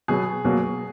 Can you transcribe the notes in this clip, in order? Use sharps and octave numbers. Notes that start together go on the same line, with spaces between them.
B2 F#3 B3 G#4
B2 F#3 A#3